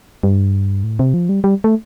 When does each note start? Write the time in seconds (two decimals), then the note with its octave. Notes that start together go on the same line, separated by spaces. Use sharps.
0.23 G2
0.84 A2
0.99 C3
1.14 F3
1.29 G3
1.44 G3
1.64 A3